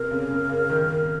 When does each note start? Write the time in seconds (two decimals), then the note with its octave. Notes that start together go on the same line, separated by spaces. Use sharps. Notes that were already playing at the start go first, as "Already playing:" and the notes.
Already playing: C3 A#4
0.11 C#3
0.31 C#3
0.49 C#3
0.69 D#3